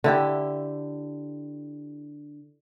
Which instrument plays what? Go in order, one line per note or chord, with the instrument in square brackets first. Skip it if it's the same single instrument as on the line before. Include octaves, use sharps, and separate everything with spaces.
[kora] D3 E4 G4